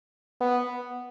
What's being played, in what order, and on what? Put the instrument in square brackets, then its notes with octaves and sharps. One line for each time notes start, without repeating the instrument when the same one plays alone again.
[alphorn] B3